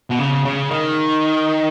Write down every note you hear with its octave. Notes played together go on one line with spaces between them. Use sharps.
B2
C#3
C#3
D#3